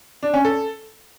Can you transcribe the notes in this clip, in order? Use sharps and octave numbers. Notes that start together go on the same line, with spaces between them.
D4
C#4
A4